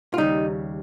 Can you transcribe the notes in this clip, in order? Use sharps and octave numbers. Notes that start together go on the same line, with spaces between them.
F4
D#2 C#3 G3 D#4